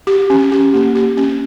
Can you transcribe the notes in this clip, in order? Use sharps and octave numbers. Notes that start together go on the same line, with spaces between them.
G4
C#4
G4
A#3
G4
C#4